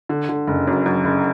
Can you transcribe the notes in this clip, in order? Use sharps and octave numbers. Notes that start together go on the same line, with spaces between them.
D3
D3
F#1
F#2
F#2
F#1